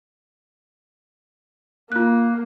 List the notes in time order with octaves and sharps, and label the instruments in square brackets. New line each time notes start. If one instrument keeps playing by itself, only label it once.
[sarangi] A#3 [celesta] F4 F#6